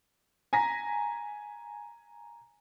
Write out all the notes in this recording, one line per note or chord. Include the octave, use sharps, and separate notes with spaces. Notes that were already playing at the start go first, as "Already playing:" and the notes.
G#5 A#5 A#6 B6